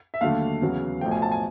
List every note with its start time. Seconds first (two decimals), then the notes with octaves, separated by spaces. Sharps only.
0.14 E5
0.21 D#2 D3 F#3 A3 F5
0.62 E2 C#3 F#3
1.01 B1 A2 F3 A3 G5
1.11 G#5
1.22 A5
1.32 G#5